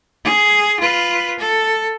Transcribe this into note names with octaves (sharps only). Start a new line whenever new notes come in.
G#4
F4 B4
A4